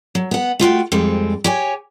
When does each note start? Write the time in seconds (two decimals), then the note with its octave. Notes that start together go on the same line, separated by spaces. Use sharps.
0.15 F#3
0.31 B3 F#5
0.59 A3 F4 F#4 G5
0.92 F2 G3 G#3 C4
1.44 G4 C#5 G#5